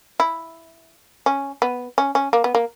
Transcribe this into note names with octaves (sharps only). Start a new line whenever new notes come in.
E4
C#4
B3
C#4
C#4
A#3
B3
A#3